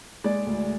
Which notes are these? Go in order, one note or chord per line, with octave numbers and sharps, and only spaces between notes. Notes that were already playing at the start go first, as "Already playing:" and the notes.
G#3 D5
D2